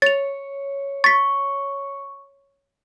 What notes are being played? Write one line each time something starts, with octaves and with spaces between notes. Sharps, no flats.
C#5 A6 F7
C#6 A6 B6